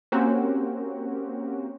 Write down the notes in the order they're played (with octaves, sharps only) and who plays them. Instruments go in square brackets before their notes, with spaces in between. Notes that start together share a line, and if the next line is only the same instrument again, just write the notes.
[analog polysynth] A#3 C4 C#4 F#4 G4 A#4